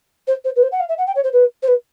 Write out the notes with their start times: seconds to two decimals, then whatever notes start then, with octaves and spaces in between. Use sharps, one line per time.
0.27 C5
0.45 C5
0.56 B4
0.63 C5
0.72 F#5
0.80 F5
0.89 E5
0.98 F#5
1.07 G5
1.15 C#5
1.24 C5
1.33 B4
1.63 C5
1.68 B4